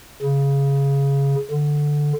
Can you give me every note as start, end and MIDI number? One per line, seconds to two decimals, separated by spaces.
0.22 1.35 49
1.51 2.13 50